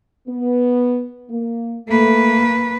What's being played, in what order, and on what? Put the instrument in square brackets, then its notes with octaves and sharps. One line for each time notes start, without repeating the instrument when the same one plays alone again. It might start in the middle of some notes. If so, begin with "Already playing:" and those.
[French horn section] B3
A#3
[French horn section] A3 [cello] A#3 B4